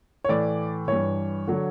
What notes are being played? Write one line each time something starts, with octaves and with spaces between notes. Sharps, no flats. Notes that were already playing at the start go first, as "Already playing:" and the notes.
C#5
A2 E3 D5
G2 E3 C#5
D3 F#3